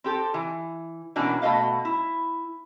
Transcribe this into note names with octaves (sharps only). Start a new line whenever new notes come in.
C4 G4 A4
E3
B2 E3 A#3 C#4 D4 F#4
B2 A3 F#4 D#5 F5
E4